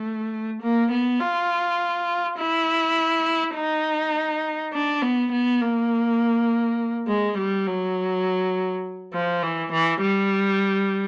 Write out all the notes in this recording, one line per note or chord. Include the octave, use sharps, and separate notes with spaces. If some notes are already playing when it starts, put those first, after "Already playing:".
Already playing: A3
A#3
B3
F4
E4
D#4
D4
B3
B3
A#3
G#3
G3
F#3
F3
E3
E3
G3